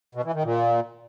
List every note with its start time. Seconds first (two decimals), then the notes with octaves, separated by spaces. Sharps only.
0.15 B2
0.25 E3
0.34 D#3
0.44 A#2